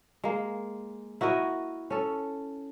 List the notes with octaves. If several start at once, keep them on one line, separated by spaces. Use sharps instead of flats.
G#3 A#3
E4 F#4 A#4 D#5
C#4 A4